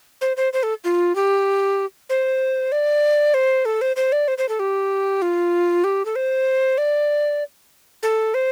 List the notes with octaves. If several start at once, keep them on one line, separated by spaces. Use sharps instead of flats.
C5
C5
C5
A4
F4
G4
C5
D5
C5
A4
C5
C5
D5
C5
C5
A4
G4
F4
G4
A4
C5
D5
A4
C5